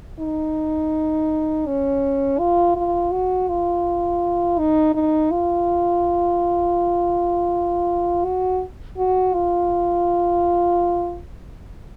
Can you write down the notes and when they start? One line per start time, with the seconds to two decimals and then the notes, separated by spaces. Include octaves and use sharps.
0.20 D#4
1.67 C#4
2.39 F4
2.76 F4
3.12 F#4
3.48 F4
4.59 D#4
4.95 D#4
5.31 F4
8.24 F#4
8.97 F#4
9.34 F4